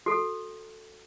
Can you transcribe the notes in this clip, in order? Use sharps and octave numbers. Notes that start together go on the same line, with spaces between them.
F#4 A4